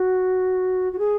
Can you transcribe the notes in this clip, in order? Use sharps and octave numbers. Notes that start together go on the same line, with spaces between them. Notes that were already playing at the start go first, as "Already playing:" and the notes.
Already playing: F#4
F#4
G#4